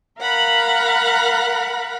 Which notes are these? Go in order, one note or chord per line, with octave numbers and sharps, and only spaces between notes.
A#4 F5 F#5 B5